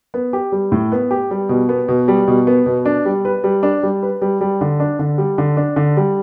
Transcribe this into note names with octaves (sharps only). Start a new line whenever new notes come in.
B3
G4
G3
A2
B3
G4
G3
B2
B3
B2
G3
B2
B3
B2
D4
G3
B4
G3
D4
G3
B4
G3
G3
D3
D4
D3
G3
D3
D4
D3
G3